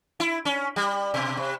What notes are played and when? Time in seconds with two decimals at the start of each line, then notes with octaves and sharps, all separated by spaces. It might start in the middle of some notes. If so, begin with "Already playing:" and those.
0.20 E4
0.45 C#4
0.76 G3
1.14 B2
1.37 C3